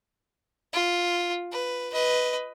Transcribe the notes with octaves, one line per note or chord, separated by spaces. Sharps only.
F4
B4
B4 D#5